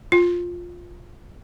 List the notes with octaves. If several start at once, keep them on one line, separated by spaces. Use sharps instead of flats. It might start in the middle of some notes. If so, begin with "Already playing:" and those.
F4